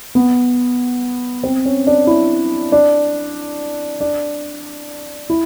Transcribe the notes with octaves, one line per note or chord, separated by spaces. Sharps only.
B3
C4
C#4
D4
E4
D4
D4
E4